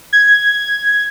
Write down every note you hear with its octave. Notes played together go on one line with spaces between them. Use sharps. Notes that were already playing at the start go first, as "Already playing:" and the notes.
G#6